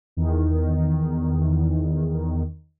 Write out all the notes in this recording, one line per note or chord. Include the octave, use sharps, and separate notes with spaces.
E2 D#3